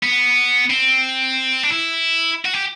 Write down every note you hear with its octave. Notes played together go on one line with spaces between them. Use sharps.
B3
C4
D4
E4
F#4
G4